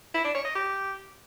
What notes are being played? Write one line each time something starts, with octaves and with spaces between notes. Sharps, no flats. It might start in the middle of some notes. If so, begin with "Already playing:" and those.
E4
D4
C#5
D#5
G4